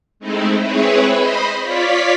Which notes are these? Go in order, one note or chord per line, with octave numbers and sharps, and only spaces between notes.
G#3 A3 C4 D#4 E4
C4 E4 G#4 B4 C#5
C5 D#5 B5
F4 C#5 D5 B6